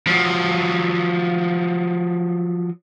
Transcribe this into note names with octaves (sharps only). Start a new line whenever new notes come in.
F3 F#3